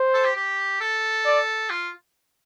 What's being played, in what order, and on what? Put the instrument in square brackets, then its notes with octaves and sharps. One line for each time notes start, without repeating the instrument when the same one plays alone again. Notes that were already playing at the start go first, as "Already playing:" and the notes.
Already playing: [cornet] C5
[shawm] A4
G4
G4
A4
[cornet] D5
[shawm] F4